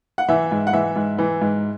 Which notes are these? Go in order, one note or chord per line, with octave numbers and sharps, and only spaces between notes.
F#5
E3 E5
G#2
F#5
E3 E5
G#2
E3
G#2